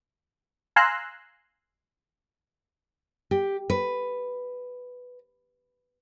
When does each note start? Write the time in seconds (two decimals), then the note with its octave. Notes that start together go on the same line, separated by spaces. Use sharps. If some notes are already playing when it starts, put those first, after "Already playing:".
0.76 F5 G#5 A#5 C6 E6 F#6
3.31 G4
3.70 B4